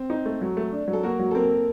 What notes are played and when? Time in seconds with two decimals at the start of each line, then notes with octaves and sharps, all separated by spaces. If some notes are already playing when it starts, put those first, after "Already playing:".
Already playing: C4
0.10 D#4
0.26 A3
0.42 F#3
0.57 A3
0.72 D4
0.88 F#3
0.93 A4
1.03 A#3 F#4 A#4
1.19 F#3
1.31 A4
1.35 A#3 C4 A#4